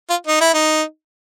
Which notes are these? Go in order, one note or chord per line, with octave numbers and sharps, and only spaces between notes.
F4
D#4
E4
D#4